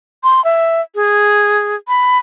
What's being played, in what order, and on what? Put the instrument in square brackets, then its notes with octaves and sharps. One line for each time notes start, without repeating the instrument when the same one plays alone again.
[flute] C6
E5
G#4
B5